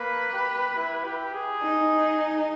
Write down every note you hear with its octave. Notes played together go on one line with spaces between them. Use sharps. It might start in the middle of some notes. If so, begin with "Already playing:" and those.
Already playing: A#3 B4
G4
E4
G4
G#4
D#4